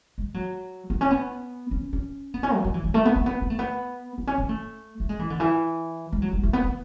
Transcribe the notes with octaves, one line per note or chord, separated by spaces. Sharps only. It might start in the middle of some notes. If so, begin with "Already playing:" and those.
G#3
F#3
B3
C#4
B3
C#4
C#4
B3
C#4
F#3
F#3
E3
F#3
A3
B3
A3
B3
B3
A3
B3
B3
C#4
C#4
A3
A3
G#3
E3
D3
E3
G#3
F#3
G#3
A3
B3
B3